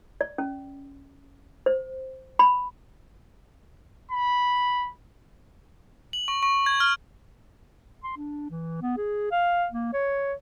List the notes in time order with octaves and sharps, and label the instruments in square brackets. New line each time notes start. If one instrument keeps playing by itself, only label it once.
[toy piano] D5
C#4
C5
B5
[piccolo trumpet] B5
[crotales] F#7
C#6
C#6
G#6
F6
[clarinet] C6
D4
E3
B3
G#4
F5
A#3
C#5